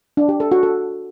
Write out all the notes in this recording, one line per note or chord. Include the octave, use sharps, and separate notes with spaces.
D4
G4
A4
F#4
A4